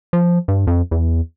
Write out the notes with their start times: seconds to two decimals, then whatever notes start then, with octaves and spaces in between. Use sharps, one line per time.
0.13 F3
0.48 G2
0.67 F2
0.91 E2